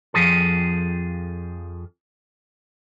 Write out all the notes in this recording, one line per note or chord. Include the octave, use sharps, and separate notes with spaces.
F2 C#3 F3 G#4 A4